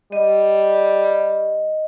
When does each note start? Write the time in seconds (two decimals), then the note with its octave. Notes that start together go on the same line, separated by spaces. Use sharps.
0.12 G3 D#5